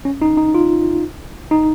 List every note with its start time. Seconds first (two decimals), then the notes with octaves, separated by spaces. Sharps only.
0.05 C#4
0.22 D#4
0.37 D#4
0.55 F4
1.51 D#4